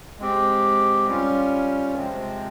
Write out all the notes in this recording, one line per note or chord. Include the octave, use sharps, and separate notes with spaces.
G#3 C4 G4
G3 C#4 F4
C3 F3 G#3 C4